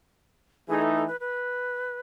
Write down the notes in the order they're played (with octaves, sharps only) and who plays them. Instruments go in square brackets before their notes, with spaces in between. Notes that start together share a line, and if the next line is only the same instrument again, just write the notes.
[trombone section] E3 A3 D#4 [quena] G#4
[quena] A4
A4
B4
B4